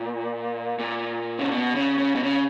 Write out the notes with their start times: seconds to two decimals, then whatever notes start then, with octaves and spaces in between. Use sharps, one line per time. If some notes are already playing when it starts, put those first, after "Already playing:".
Already playing: A#2
0.79 A#2
1.39 C#3
1.51 B2
1.75 C#3
1.98 C#3
2.15 B2
2.23 C#3